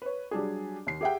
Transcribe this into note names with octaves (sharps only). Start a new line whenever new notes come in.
B4 C#5
F#3 G3 D4 G#4
D#2 C7
G4 G#4 E5 F#5 G5